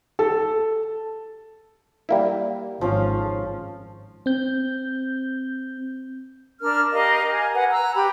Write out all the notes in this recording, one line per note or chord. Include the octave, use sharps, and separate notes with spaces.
A4
G3 A#3 E4
G#1 F3 C#4 F5
C4 G6
D4 A#4 D5 F6
G4 A#4 D#5 F5
G#5
B4 F#5 G#5
A#5 E6 F#6
G4 B5